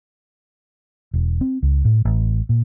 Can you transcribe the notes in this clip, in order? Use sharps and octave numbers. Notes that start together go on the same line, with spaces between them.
E1
C4
C#2
A2
A1
A#2